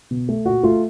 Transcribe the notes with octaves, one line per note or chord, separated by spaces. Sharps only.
B2
A3
A#2 F#4
A3 F4